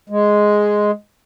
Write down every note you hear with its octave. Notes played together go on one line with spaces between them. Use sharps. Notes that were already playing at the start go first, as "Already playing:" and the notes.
G#3